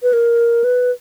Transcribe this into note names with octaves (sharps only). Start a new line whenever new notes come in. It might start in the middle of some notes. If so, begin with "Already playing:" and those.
B4
A#4
B4